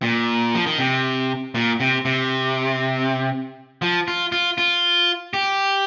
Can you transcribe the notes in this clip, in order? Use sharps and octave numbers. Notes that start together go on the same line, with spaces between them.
A#2
F3
D#3
C3
A#2
C3
C3
F3
F4
F4
F4
G4